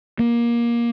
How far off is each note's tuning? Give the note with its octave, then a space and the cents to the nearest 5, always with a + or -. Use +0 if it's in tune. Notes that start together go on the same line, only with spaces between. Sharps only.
A#3 +20